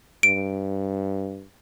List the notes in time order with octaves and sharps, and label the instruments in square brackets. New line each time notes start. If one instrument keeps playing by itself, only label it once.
[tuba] G2 [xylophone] D7